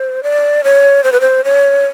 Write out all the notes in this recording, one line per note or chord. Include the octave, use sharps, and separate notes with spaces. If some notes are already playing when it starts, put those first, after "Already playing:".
Already playing: C5
D5
C#5
C5
B4
C5
C#5